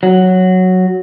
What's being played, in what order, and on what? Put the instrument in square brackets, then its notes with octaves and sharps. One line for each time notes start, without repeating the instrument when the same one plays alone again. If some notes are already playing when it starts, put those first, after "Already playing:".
[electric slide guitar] F#3